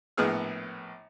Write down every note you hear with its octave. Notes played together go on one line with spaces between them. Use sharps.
A#1 A2 B3 G#4 F6